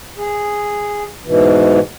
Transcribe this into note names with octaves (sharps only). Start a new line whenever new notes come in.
G#4
G#2 B2 E3